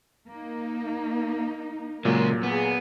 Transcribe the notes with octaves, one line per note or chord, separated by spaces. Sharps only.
A#3 D#4
A#2 C#3 F#3 G#3 A#3 A#4
B3 G#4